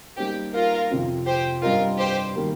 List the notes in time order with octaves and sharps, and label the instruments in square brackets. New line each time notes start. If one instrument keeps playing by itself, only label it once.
[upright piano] G3 A#3 D#4 C5 [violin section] G4
[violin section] F4 A#4
[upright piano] F2 C3 F3 C4 F4
[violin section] G4 C5
[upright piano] G2 G3 C4 G4 D#5 [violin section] F4 A#4
[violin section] G4 C5
[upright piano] D#3 G3 A#3 G4 A#4